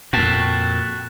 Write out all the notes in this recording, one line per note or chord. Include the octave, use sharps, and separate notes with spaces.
F2 A#2 F#4 G5 A5